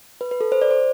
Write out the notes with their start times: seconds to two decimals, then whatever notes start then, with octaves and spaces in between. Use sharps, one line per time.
0.21 B4
0.31 B4
0.41 A4
0.52 C5
0.62 D5
0.71 C5